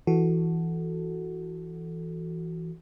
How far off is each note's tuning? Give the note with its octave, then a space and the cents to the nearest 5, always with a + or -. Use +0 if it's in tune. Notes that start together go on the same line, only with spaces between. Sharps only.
E3 +0 F#4 +0 A4 +0